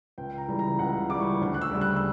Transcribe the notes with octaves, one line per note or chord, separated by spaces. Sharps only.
C#2 G5
A#5
C#3 E3 G3
A#5
C#2 F#5
C#3 E3 G3 D6
C#6
D2
F#6
E6
C#3 G3
F#6
E6